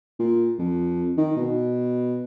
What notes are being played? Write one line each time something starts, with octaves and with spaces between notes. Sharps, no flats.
A#2
F2
D#3
B2